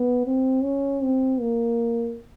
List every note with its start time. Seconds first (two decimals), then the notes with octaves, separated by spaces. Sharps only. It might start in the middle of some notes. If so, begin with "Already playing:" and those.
Already playing: B3
0.26 C4
0.64 C#4
1.03 C4
1.41 A#3